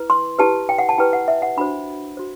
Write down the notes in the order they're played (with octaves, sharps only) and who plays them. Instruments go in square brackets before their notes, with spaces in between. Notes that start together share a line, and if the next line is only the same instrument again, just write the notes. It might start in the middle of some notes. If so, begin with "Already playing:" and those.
Already playing: [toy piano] E4 B4
C6
E4 G4 B4 A5
G5
F#5
A5
E4 G4 B4 G5
F#5
E5
F#5
D4 F#4 C5 B5
F#4 C5